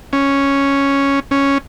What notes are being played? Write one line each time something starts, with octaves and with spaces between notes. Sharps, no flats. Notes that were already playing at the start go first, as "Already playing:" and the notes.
C#4
C#4